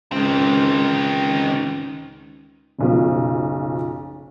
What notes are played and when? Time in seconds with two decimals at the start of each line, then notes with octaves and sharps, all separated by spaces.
0.12 C#2 D#3 C4
2.79 F#1 B1 F3